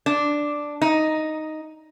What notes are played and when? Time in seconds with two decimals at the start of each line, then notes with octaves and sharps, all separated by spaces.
0.06 D4
0.82 D#4